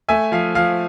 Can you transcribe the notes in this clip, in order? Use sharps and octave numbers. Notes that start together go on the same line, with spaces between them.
A3 E5 G#5
F3 F5
F3 F5